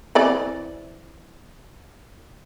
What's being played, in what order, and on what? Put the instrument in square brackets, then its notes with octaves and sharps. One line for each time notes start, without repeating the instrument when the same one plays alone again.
[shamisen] E3 C4 D5